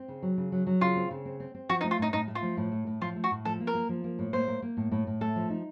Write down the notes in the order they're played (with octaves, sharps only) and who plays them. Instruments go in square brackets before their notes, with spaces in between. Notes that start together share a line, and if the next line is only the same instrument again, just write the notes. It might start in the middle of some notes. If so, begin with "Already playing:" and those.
Already playing: [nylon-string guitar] C4
C#3
F#3
C#3
F#3
F#3
[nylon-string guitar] C#3 [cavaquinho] F4
[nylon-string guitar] C4
C#3
C4
C4
C4
[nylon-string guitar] F3 [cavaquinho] F#4
[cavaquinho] D#4
[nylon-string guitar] A3
[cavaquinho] F4
[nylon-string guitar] A2 [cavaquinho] D#4
[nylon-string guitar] A2 [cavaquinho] D#4
[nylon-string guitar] A3
[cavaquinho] F4
[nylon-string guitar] F3
A2
A3
A2
[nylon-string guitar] F3 [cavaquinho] F4
[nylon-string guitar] A3
[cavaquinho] F#4
[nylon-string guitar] A2
[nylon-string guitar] F3 [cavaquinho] A4
[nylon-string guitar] A#3
[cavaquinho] A#4
[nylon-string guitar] A#3
F3
A#3
A2
[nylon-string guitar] A#3 [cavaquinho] C5
[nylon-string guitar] A#3
A#3
A2
A2
A2
[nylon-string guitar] A3 [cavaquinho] A4
[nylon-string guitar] F3
D#4